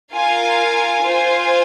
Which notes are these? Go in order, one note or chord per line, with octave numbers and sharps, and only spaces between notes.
F4 A#4 F5 G#5
F4 C5 G#5